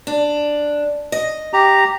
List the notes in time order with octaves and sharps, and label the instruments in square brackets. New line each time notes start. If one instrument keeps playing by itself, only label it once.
[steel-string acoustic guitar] D4
D#5
[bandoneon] G4 A#5